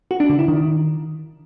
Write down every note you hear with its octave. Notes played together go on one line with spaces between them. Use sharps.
F#4
D4
D3
E4
D#3